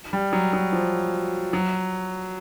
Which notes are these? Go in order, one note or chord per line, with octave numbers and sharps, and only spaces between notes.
G3
F#3
F#3
F3
F#3